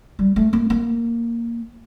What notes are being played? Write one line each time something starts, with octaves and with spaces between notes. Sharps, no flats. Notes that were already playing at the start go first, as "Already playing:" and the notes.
G3
A3
A#3
A#3